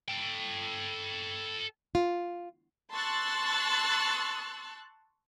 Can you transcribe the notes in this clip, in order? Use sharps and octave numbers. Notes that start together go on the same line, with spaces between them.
A4 G5
F4
A5 C6 C#6 E6 F#6 A6